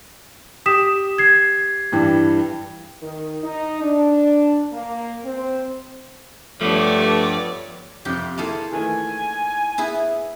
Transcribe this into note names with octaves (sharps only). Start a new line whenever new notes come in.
G4 D#6 B6 E7
G#6 C7
G2 E3 G3
D#3
D#4
D4
A#3
C4
G2 F3 A3 B3 C#5 D5 D6
F2 C3 G4
A#3 E4 F4 G#4 A4
D#3 E3 A3 G#5
B3 E4 G#4